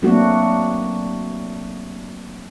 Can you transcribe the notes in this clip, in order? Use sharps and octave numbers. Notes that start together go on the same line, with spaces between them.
F#3 A3 A#3 C4 D4 F#4